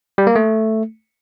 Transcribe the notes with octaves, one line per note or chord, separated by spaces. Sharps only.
G3
A#3
A3